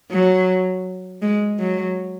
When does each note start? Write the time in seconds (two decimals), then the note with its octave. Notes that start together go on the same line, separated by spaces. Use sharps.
0.11 F#3
1.22 G#3
1.59 F#3